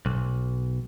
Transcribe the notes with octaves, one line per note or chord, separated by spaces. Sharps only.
B1